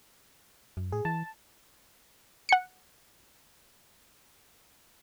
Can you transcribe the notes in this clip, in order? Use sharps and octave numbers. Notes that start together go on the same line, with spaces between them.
F#2
A2 G#4
E3 A5
F#5 C#7